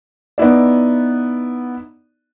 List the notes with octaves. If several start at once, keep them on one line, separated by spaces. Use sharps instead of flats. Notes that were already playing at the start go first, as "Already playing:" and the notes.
B3 D#4 E4 D5